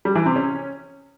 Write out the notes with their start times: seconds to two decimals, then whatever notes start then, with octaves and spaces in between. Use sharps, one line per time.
0.05 G3
0.15 E3
0.26 C3
0.36 C#4